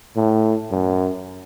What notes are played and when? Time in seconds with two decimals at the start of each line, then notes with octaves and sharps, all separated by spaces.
0.16 A2
0.71 F#2